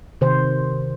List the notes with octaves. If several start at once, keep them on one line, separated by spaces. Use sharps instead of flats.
C3 D#3 C5